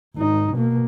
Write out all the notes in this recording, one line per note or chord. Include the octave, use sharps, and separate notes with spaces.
G#1 D#4
B2 A#3